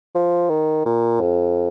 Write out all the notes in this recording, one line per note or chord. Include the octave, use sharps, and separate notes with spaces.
F3
D#3
A#2
F2